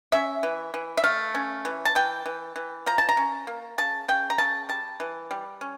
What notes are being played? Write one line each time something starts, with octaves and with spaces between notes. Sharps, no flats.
C#4 E5
E3
E3
E5
A3 F5
C#4
E3
A5
E3 G5
E3
E3
F3 A#5
A5
A#5
C#4
A#3
C#3 A5
C#3 G5
A#5
C#3 A5
G3 A5
E3
G3
C#4